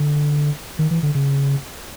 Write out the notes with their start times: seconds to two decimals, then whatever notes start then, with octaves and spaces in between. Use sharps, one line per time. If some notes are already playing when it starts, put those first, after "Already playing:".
Already playing: D3
0.79 D#3
0.91 E3
1.03 D3
1.15 C#3